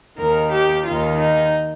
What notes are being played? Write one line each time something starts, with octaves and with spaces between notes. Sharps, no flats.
D#2 D#3 A#4
G4
D#2 D#3 F4
D#4